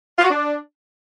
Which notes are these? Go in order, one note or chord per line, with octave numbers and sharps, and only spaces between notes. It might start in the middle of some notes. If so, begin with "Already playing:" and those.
F4
F#4
D4